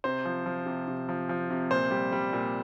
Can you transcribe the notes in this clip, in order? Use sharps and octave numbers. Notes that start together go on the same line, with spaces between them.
C3 C5
F3
F3
C3
C3
F3
F3
C3
A#2 C5
G3
G3
A#2